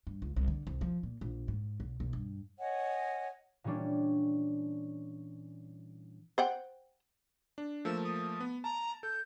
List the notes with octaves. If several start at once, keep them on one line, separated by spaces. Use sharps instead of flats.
G2
C#2
C2
D3
C2
F3
A#2
A#1
G#2
B1
B1
G2
C#5 D#5 F#5 G#5
A#2 E3 G3 C#4 D4
C5 F#5 G5
D4
F3 A3 A#3 E6
D#6
B3
A5 A#5
A4 G6